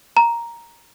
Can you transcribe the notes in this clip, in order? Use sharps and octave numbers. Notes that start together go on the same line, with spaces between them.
A#5